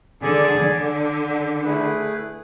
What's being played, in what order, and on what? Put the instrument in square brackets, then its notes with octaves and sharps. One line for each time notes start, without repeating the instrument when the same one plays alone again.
[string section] D3 [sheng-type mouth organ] G#4 D5 G#5
[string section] D3
[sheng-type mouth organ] A3 E4 G#4 B4